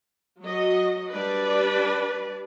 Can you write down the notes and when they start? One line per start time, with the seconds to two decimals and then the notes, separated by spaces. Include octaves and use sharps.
0.40 F#3 F#4 D#5
1.13 G3 D4 B4 D5